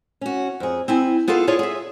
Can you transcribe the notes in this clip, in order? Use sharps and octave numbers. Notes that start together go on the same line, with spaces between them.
C#4 F#4
F2 G#4
C4 E4 G#5
B3 F4 G#4 A4 F5
E4 F4 G#4 A4 C#5 D5
G#4 E5